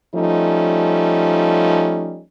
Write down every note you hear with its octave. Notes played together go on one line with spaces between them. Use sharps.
F3 G3 A3 C#4 D#4